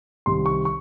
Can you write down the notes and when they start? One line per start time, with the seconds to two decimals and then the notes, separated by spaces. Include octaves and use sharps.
0.26 C2 C3 D#3 C6
0.46 C#6
0.65 C#6